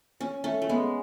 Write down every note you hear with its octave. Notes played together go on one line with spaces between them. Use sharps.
C#4
A3 C#4
A3
G#3 B3